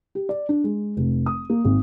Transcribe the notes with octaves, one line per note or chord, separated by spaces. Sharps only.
G4
D5
D4
G#3
F1
D#6
A#3
G#1